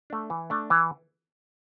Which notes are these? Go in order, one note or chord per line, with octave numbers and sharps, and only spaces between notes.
A3 D4
E3
A3 D4
E3